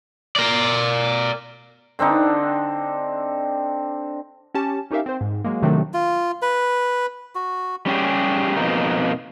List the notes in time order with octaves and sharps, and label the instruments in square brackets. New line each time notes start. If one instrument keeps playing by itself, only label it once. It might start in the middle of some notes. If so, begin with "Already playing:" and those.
[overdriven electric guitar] A#4 D5
[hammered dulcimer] D3 C4 D4 D#4
[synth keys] C#4 G4 A5
C#4 D#4 G4 A#4 E5 F5
C4 C5
G#2
F#3 G#3 A#3
C3 D#3 F#3 A3 C4 D4
[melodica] F4
B4
F#4
[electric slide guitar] G3 C#4 G4 G#4
F2 B2 A#3 D#4